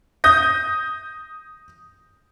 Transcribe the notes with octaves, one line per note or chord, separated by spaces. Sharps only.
D#6 G6 A#6